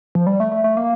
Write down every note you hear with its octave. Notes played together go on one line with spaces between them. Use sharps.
F3
G3
A3
A3
A3
A#3